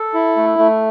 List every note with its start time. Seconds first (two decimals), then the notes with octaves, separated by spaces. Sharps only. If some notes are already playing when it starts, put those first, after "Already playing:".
Already playing: A4
0.14 E4
0.36 A3
0.58 A3